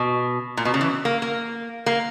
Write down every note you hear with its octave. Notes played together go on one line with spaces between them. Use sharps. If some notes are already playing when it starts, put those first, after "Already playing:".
Already playing: B2
A#2
B2
C#3
E3
A#3
A#3
A#3